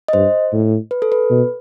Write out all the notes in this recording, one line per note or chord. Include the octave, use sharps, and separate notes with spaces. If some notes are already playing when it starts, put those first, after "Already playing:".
D#5
G2 C5
A2
B4
A4
B4
B2